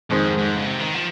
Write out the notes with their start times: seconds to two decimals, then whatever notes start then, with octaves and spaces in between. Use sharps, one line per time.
0.10 F2 G#2 D#3 G#3 C4
0.38 G#2
0.56 C#3
0.66 C3
0.80 D#3
0.94 F3